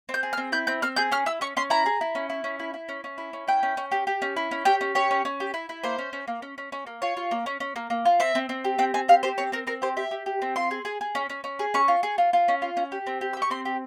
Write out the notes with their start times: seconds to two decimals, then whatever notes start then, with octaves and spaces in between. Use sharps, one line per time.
0.09 C4
0.14 G6
0.23 G#4
0.33 F6
0.37 C4
0.52 E4 G6
0.67 C4 G6
0.82 C4 F6
0.96 G#4 G6
1.12 C#4 F6
1.26 E4 E6
1.41 C#4 C#6
1.57 C#4 C6
1.70 E4 A#5
1.86 G#4
2.01 E4
2.15 C#4
2.30 E4
2.44 C#4
2.59 E4
2.74 E4
2.89 C#4
3.04 C#4
3.18 E4
3.33 C#4
3.48 E4 G5
3.63 C#4
3.77 C#4
3.92 G4
4.07 G4
4.22 C#4
4.37 E4
4.51 C#4
4.65 G4 G5
4.81 C#4
4.95 G4 C#5
5.11 C#4
5.25 C#4
5.40 G4
5.54 E4
5.69 E4
5.84 A#3 C5
5.98 C#4
6.13 C#4
6.28 A#3
6.42 C#4
6.58 C#4
6.72 C#4
6.87 A#3
7.02 F4 C#5
7.17 F4
7.31 A#3
7.46 C#4
7.60 C#4
7.76 A#3
7.90 A#3
8.05 F4
8.20 C4 E5
8.35 C4
8.49 C4
8.65 G4
8.78 C4 G5
8.94 C4 G#5
9.08 G4 F5
9.23 G4 C5
9.38 C4 C#5
9.52 C4 A#4
9.67 C4 A#4
9.82 G4 C5
9.97 G4 E5
10.11 G4
10.26 G4
10.42 C4
10.56 F4 C6
10.71 G#4
10.85 G#4
11.01 G#4
11.15 C#4
11.30 C#4
11.44 C#4
11.59 G#4
11.74 C#4 C#6
11.88 F4
12.03 G#4
12.18 F4
12.33 F4
12.48 C#4
12.62 F4
12.77 C#4
12.92 G4
13.07 C4
13.21 G4
13.33 E6
13.37 G4
13.42 C#6
13.50 C4 C6
13.65 G4